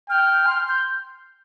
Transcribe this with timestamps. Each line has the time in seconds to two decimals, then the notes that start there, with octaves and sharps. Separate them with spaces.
0.10 G5 F6
0.47 C6
0.69 G6